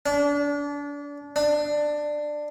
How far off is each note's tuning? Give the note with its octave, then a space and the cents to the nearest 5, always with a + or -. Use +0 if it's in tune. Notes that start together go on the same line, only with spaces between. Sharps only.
D4 -30
D4 +15